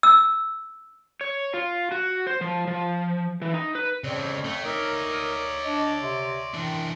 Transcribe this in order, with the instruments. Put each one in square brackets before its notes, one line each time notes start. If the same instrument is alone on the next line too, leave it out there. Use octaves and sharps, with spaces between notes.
[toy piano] E6
[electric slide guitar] C#5
F4
F#4
C5
F3
F3
E3
D#4
B4
[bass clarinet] F2 [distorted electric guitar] C#3 C4 [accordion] C#5 [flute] D5
[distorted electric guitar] A3
[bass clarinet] D#4 [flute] A#4 [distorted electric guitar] D5 E5
[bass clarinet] D4 [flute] D#5
[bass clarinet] C3 [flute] C6
[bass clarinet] D#3 [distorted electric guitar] E3 D4